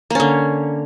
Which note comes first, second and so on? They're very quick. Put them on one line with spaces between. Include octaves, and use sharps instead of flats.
A#3 C#4 D3